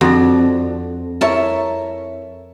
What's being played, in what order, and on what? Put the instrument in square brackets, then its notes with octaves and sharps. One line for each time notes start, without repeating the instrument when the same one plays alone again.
[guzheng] F2 [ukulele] D4 D#4 F#4
[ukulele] E4 C#5 E5 [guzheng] A#4 A5